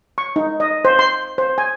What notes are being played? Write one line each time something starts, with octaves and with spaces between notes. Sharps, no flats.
C#6
D#4
D#5
C5
C6
C5
G#5